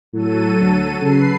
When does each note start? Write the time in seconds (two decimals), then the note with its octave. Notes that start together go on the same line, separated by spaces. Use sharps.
0.13 A2 F#3 A4 D#7
0.61 D2
1.02 C#3 B4 C7